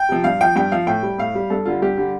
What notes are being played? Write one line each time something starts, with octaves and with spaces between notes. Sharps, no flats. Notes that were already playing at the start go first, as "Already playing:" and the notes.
Already playing: G5
C3 F3
G2 F5
F3 G5
G2 G5
F3 F5
A2 G5
G3
A2 F5
G3
G2 A4
D3 G3 F4
G2 G4
D3 G3